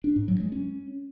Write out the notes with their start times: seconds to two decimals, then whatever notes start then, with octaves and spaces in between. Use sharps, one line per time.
0.04 D4
0.16 G#2
0.28 F#3
0.40 G#3
0.52 C#4